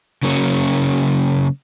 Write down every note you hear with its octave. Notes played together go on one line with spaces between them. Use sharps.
C#3 F#3 A#3 C#4